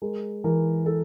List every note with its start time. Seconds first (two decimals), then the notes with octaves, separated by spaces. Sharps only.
0.02 G#3 A#4
0.44 E3 A#4
0.86 A4